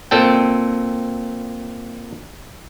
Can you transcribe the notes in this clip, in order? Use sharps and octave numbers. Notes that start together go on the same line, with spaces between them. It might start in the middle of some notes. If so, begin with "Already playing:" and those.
A#2 C4 A4 G5